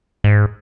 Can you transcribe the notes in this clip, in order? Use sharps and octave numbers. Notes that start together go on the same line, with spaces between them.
G#2